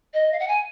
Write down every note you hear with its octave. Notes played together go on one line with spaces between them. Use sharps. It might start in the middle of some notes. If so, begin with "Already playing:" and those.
D#5
F5
F#5
G#5